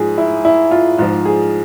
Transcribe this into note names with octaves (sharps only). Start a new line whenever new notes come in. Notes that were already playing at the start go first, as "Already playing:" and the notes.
Already playing: G#2 F3 G#4
E4
E4
F4
G#2 F3 F4
G#4